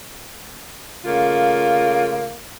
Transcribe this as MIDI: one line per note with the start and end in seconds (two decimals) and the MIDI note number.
1.05 2.36 49
1.05 2.36 57
1.05 2.36 58
1.05 2.36 65